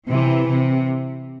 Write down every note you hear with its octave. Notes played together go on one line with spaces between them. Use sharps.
C3 E3
C3